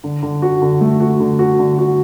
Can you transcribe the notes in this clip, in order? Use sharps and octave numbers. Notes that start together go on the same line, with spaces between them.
D3
D3
F#4
D3
A3
F#4
D3
F#4
D3
F#4